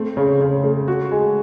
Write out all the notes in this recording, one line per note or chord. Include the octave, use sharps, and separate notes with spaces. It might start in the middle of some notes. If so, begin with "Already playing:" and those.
Already playing: A3 C4
C#3
C#3
A3
F#4
G#3